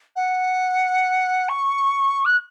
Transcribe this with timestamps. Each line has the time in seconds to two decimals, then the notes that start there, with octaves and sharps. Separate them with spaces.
0.16 F#5
1.49 C#6
2.25 F#6